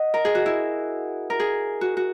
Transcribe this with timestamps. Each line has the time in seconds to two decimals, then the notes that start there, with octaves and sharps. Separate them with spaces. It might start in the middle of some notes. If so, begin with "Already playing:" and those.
Already playing: D#5 F#5
0.14 A#4
0.25 G#4
0.35 F#4
0.46 E4
1.30 A#4
1.40 G#4
1.81 F#4
1.97 F#4